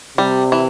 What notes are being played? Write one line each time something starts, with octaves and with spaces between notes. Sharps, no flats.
C3 G3
E3